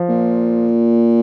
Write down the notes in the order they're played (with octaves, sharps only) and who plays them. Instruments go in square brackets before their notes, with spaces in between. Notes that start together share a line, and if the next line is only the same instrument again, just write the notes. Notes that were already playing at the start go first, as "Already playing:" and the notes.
Already playing: [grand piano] F3
[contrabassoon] A#2